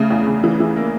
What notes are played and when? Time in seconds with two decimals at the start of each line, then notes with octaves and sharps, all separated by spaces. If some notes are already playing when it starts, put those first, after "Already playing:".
Already playing: C#3 A3
0.10 E2
0.27 C#3
0.44 E3
0.60 E3
0.76 A#3